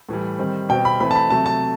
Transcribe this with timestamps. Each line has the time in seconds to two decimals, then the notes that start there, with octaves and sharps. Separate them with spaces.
0.09 A2 E3 G3
0.38 D#3 G3 C4
0.69 B2 G3 C4 G5
0.85 B5
1.00 E3 A3 C4 B5
1.11 A5
1.15 B5
1.30 C3 F#3 A3 A5
1.46 A5